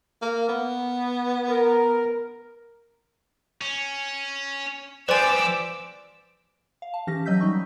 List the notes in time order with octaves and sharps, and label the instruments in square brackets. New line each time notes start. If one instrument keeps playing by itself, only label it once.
[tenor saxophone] A#3
B3
[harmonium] A#4
[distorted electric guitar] C#4
[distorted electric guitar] F3 G3 [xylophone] B4 G#5 [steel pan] C5 D5 [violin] D6 E6
[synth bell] F5
A5
E3 C#4 G4 A#6
E3 F#3 D#5 E6 G6 B6
G3 D#4 C#6